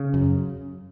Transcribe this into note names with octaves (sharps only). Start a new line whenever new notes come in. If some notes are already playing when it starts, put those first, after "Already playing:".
Already playing: C#3
F#2